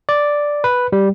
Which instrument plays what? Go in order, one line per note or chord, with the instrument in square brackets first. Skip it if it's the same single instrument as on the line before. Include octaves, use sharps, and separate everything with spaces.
[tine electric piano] D5
B4
G3